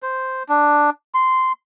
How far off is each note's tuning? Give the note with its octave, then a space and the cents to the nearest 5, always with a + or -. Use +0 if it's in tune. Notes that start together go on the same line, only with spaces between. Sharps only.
C5 -5
D4 +0
C6 -15